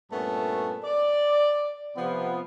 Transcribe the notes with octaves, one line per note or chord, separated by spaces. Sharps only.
G2 A#2 A3 B3 C#4 A5
D5
C3 F3 B3